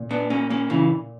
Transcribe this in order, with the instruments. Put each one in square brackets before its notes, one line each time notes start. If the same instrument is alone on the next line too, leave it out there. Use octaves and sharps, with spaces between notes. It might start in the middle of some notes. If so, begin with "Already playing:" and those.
Already playing: [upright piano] A#2
[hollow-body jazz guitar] B3 D4
A#3 C#4
A#3 C#4
C#3 E3